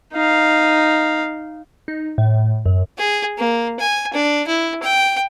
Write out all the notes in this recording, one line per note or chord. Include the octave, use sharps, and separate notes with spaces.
D#4 F5
D#4
A2
F#2
G#4
A#3
G#5
D4
E4
G5